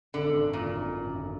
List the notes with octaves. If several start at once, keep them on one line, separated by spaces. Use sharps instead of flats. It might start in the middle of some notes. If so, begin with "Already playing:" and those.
G#1 D3
G#1
F#2
A#2 D3
G#1
G#1
F#2
D3